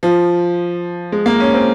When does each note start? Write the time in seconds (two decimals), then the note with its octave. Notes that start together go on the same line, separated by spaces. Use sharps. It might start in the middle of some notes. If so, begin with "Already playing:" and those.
0.03 F3
1.12 G#3
1.26 A#3
1.40 C#4
1.54 C4